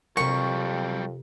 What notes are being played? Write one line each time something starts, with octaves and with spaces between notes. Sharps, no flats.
F2 C3 F#3 G3 A#4 C#6